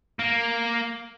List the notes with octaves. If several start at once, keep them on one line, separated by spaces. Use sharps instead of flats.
A#3